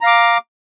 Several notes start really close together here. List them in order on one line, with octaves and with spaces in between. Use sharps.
A#5 F5 D6